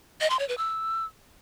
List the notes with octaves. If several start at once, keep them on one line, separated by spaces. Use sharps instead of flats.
D#5
C6
C#5
B4
E6